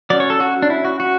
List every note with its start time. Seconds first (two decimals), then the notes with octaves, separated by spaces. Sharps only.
0.10 F#3 C#4 D5
0.20 C#5
0.30 A4
0.40 F#4
0.62 D4
0.70 E4
0.85 F#4
1.00 F#4